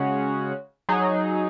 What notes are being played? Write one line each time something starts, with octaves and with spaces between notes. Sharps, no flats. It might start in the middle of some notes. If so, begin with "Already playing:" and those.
Already playing: C#3 G#3 C#4 F#4
F#3 D#4 G#4